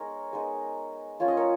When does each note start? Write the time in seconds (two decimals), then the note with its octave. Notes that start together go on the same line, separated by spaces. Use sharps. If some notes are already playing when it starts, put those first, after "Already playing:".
Already playing: G#3 B3 D#4 A#4 C#5
0.33 G#3 B3 D#4
1.20 F3 A#3 C#4 F4 C#5
1.28 D#5
1.37 A#4 C#5